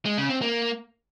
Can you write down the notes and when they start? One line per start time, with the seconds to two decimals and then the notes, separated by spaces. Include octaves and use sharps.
0.06 G#3
0.18 C#3
0.30 C4
0.42 A#3